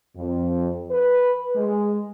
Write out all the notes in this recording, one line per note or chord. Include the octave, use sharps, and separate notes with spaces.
F2
B4
G#3